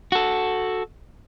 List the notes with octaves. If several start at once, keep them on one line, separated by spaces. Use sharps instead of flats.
F#4 A4